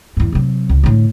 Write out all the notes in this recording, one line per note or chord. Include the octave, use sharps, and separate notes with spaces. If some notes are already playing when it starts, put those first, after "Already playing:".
E2 G#2
C3 F#3
C#2
A2 D3